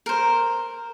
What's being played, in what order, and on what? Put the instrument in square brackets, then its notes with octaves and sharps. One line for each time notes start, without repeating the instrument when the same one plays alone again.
[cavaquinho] A#4 C5